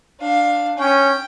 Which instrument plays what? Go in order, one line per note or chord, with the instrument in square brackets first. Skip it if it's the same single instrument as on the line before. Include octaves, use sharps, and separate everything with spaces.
[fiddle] D4 F5
[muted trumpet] C#4 [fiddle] G5